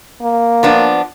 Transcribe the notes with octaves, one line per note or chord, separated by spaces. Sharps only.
A#3
F3 B3 D4